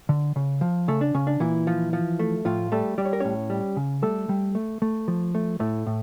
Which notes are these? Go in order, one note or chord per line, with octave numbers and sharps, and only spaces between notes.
D3
C#3
F3
C#3 A3 A4
D4
C#3 C#4
D4
A#2 E3 E4
F3
F3
A3
A2 F3 F4
G3 A3 A4
G3 D5
C#5
A#4
A2 C#4 C#5
G3
C#3
G3 A3 A4
G3
A3
A3
F3
A3
A2 A3 A4
A2